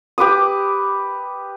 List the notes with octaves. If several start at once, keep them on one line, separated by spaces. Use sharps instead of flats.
G4 B4 D6 D#6